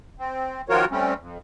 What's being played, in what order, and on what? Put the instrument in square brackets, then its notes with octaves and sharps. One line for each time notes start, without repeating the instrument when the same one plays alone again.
[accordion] C4
D#3 F3 F4 F#4 A#4 C#5
G3 A3 C4 C#4
F2